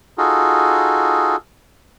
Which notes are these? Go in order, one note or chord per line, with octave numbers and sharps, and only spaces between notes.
D#4 F4 F#4 G#4 A4